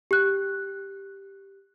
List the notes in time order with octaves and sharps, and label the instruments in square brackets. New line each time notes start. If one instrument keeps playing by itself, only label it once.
[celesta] G4 F#6